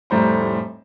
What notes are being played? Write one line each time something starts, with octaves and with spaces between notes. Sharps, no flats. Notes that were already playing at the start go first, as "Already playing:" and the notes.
F1 A2 G3 C5 A#5